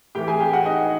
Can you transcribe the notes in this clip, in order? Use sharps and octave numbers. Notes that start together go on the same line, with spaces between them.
A2 E3 A3 G4 G5
G#4 G#5
G4 G5
F#4 F#5
D#4 D#5